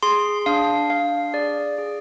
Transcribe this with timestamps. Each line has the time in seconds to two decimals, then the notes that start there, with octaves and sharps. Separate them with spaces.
0.03 G#4 C6
0.46 D4 F5
0.90 D4 F5
1.33 G#4 D5
1.78 G#4